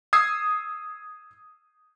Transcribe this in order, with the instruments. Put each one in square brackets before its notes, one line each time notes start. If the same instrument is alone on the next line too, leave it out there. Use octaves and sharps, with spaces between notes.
[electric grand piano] D#6 E6 G#6 C7